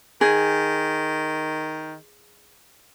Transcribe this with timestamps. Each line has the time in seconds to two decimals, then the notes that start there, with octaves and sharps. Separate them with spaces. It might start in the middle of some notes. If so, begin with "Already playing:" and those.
0.21 D#3 G#4